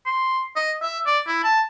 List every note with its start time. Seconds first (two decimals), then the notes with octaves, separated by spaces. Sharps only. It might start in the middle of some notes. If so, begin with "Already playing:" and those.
0.06 C6
0.56 D#5
0.82 E5
1.06 D5
1.27 E4
1.44 A5